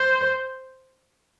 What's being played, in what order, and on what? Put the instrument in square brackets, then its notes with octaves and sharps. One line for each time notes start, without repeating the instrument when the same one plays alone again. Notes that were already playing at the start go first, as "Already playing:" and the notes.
Already playing: [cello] C5